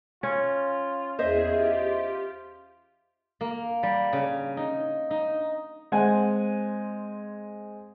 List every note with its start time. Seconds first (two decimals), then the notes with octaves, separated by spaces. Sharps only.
0.23 C#4 F4
1.19 E2 G#4 C5 D#5 E5
1.52 F4 G4
3.41 A#3
3.83 G3
4.13 C#3
4.57 D#4
5.11 D#4
5.92 G#3 C4 F#5 G#5